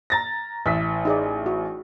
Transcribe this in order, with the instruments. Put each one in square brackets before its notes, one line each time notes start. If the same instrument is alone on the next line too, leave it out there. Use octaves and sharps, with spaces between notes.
[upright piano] A#5 A6 A#6
[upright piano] A1 B6 [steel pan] E5
[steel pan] D#4 G#4 D5
F#4